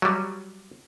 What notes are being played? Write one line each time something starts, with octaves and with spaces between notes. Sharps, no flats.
F#3 G3